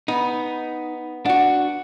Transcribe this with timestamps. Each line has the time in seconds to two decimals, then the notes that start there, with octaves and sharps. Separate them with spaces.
0.08 B3 D#4
1.26 D4 F#4 F#5